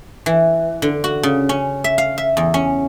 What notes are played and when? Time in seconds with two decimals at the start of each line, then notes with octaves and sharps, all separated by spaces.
0.26 E3
0.82 D3
1.04 F#4
1.23 C#3
1.49 C#4
1.84 E5
1.98 F5
2.18 E5
2.37 E2
2.54 C#4